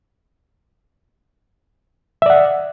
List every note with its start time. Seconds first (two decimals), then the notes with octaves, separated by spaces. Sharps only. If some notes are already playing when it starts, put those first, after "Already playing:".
2.22 E5
2.26 D5
2.30 F#5